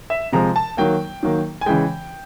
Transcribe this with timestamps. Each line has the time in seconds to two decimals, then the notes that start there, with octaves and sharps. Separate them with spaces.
0.10 E5
0.32 C3 F3 G#3 A#5
0.56 A5
0.77 D#3 F#3 A#3 G5
1.23 D#3 F#3 A#3
1.61 G#5
1.66 C#3 E3 G#3 G5